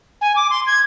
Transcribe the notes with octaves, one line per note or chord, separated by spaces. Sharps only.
G#5
D6
C6
G#6